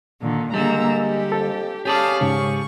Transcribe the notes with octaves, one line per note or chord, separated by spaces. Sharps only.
A#2 D3 D#3
D3 G3 G#3 A#3 A#5 E6
G4
F2 A4
C#4 G4 G#4 D5 F5 A5
G#2 C#3 C#6